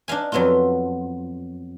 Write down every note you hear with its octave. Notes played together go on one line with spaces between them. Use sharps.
D4 D#4 F5 G#5
F2 F#3 B3 E4 F4